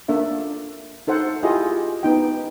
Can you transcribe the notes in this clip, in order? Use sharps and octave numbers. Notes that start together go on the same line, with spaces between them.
A#3 D4 A4 E5
D#4 A4 C5 F#5
E4 F4 G4 G#4 D#5
B3 D#4 G5